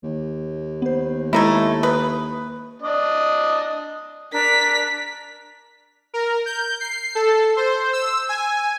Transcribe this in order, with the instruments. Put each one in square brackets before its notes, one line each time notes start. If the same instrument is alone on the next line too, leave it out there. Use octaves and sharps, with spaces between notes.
[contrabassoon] D#2
[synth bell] B3 C5
[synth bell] G#3 A4 G#6 [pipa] A3 D#4 E4
[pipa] B4 [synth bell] D#6
[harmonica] D4 D5 D#5
[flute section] D4 A#4 D5 [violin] B6
[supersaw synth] A#4
G6
C7
A4
C5
E6
G#5